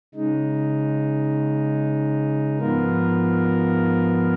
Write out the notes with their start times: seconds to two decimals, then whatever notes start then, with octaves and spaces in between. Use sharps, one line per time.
0.14 C#3 G#3 D#4
2.59 G#2 F3 B3 F4 A#4